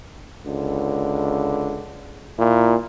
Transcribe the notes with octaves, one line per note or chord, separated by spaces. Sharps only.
C#2 D3
A#2 E4